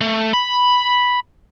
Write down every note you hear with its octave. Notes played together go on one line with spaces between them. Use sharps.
A3
B5